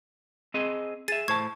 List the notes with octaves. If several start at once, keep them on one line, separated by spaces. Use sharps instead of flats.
C4 G#4 D#5
G#4 E5 A6 D#7
A2 C5 A5 C#6 G#6